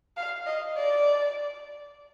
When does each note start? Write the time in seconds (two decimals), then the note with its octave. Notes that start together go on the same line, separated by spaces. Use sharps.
0.17 F5
0.46 D#5
0.76 D5